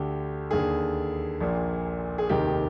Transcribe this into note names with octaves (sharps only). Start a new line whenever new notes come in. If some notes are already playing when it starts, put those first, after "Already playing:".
Already playing: D2 D3 G4
D#2 D3 G#4
A#1 A#2
G#4
F1 D#2 D#3 G4